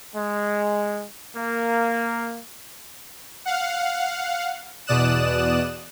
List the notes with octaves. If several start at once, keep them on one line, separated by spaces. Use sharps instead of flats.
G#3
A#3
F5 F#5
E2 B2 D5 D#6 F#6 E7